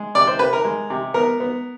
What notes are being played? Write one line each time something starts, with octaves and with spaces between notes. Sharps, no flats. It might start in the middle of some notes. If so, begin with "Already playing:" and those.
Already playing: G#3
C3 D5
C5
C3 B4
A#4
G#3
C3
B3 A#4
B3